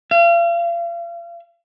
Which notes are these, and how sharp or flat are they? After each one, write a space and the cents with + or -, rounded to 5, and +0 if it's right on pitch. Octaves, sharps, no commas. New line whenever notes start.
F5 -40